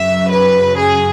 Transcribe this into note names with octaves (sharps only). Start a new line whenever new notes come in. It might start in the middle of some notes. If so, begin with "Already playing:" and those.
Already playing: F#2 C#3 F#3 E5
B4
G#4